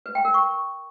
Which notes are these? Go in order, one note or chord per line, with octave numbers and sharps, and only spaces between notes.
B4
G5
A#4
C#6